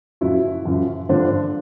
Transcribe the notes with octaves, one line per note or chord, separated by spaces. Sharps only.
F#2 C#3 F3 E4 F#4
F#2 C#3 F3
G2 D3 F3 C4 D4